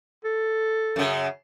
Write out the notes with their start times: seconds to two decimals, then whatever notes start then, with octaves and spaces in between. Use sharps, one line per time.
0.25 A4
0.96 F#2 C#3